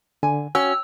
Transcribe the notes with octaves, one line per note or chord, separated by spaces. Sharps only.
D3 G#5
C#4 F#4 G5 E6